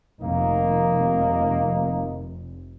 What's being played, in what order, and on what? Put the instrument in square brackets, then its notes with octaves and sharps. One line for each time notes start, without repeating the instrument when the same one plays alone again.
[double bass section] F1 [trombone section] D#3 A#3 D#4